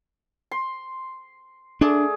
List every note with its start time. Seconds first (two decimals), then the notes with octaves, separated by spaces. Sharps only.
0.51 C6
1.81 A3 D4 G#4 D5